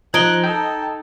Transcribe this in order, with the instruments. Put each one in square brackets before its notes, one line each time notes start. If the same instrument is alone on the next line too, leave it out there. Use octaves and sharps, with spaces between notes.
[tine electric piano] F3 [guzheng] D#4 [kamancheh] F#6 [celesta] G#6 D7 G7
[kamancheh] A4 [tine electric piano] G5